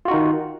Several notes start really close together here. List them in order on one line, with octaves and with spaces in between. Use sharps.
F4 F#4 D#4 D#3